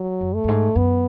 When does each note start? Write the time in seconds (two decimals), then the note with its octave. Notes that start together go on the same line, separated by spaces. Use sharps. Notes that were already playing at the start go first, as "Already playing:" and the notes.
Already playing: F#3
0.21 F#2
0.35 A3
0.44 F#2
0.48 G#2
0.75 F#2 B3